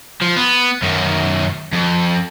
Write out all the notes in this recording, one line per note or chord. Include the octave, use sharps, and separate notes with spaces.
F3
B3
F#2 D#3
F2